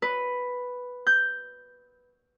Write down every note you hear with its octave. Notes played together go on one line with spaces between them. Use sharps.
B4
G6